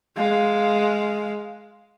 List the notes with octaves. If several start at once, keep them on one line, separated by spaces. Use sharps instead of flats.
G#3 F5